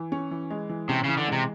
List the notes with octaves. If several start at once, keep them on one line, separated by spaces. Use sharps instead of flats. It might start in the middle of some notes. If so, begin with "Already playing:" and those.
Already playing: E3
C#4
E3
G#3
E3
C3 C#4
C#3 E3
D3
C3 G#3